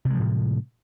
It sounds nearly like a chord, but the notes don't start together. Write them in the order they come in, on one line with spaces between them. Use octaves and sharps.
C3 G#3 F3 A2